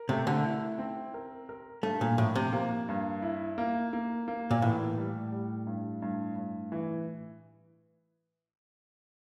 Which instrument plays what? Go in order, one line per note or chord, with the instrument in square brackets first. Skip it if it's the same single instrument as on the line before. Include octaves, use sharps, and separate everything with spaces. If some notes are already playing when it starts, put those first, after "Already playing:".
Already playing: [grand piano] A#4
[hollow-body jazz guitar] C3 [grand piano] A3
[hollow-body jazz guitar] D3
[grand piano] E4
C4
A#4
A#4
[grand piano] G2 [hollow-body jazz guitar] A3
[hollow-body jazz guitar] A#2
[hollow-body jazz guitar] A2 [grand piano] F3
[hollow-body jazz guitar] C3
[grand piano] A#3
G2
E4
A#3
A#3
A#3
[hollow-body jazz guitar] A#2
[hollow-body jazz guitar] A2 [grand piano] E3
[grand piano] G3
G3
G2
G2
G2
E3